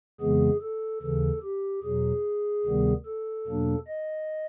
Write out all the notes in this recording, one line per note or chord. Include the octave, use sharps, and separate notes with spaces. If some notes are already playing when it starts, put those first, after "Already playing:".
F2 C#3 E3 G#3 B3 G#4
A4
D#2 C#3 E3 A4
G4
E2 B2 F#3 G#4
D2 C3 D#3 G3 B3
A4
E2 B2 F#3 A#3 D4
D#5